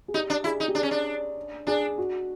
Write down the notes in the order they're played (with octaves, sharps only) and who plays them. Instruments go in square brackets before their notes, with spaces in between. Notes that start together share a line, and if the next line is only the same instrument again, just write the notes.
[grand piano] G#4
[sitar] D#4 [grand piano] G4
[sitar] D4
[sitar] E4 [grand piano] G#4
[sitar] D#4
[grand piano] G4
[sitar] D4 [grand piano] G#4
[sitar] C#4
D4
[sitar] D4 [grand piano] G#4
[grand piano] F#4